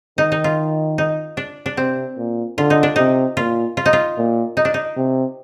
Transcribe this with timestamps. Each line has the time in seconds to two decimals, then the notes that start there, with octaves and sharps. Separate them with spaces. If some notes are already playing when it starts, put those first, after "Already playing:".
0.18 D#3 D#4
0.32 D#4
0.44 F4
0.98 D#4
1.37 D4
1.66 D4
1.77 C3 C4
2.17 A#2
2.58 D3 F4
2.70 D#4
2.83 D4
2.96 C3 D#4
3.37 A#2 F4
3.77 F4
3.86 D#4
3.93 F4
4.17 A#2
4.57 D#4
4.65 D4
4.74 D#4
4.97 C3